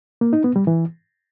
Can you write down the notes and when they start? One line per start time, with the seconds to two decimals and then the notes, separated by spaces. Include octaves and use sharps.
0.21 A#3
0.33 D#4
0.44 B3
0.56 G3
0.67 E3